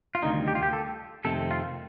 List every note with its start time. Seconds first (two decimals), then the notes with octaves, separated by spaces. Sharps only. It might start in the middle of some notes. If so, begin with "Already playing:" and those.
0.15 F4
0.22 D2 C3 D#3 G3 D#4
0.48 G4
0.55 F4
0.63 G4
0.73 A4
1.24 F2 C3 D#3 A3 C4 A4
1.51 F4